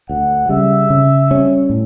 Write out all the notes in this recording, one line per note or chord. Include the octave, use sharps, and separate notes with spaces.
D2 F#5
C#3 G3 E5
C#3
G3 C#4
A2